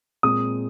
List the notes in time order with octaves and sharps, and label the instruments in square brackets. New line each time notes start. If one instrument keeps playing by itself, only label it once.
[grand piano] A#2 G#3 C4 D#6